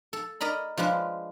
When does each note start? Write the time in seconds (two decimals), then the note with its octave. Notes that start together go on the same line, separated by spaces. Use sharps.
0.13 A4
0.41 A#4 D5 D#5 A#5 B5
0.77 F3 G#3 D4 B4